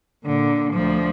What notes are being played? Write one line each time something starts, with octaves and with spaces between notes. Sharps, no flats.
A#2 D3
D2 F3